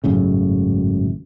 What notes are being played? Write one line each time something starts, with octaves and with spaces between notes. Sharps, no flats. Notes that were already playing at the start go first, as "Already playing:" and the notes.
G#1 F#2 A2 C#3